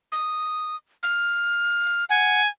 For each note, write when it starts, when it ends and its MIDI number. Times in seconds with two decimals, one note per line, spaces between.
0.12 0.76 87
1.03 2.04 89
2.10 2.41 78
2.10 2.48 80